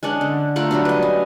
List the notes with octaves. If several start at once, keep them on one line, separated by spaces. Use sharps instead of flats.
G#3 C#4 D4 F#5
D3
A3 F4 A#4 F#5
F#3 G3 D4
B4 D#5
C#4